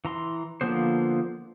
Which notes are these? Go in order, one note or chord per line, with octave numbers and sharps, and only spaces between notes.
E3 A#5 C6
D3 F3 A#3 B3 C5